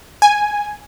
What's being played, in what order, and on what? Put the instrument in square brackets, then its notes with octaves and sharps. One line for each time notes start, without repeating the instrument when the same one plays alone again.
[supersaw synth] G#5